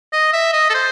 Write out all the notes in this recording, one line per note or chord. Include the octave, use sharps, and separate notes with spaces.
D#5
E5
D#5
A4
C5